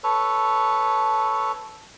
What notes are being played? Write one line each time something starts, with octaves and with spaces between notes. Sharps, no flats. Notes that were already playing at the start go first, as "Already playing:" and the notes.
A4 B4 C#5